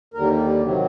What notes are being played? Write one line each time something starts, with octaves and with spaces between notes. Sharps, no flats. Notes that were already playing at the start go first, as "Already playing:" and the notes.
D#2 D3 G3 A#4
C3 D#3 F#3